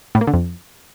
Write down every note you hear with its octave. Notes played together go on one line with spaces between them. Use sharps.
A2
A#3
D3
F2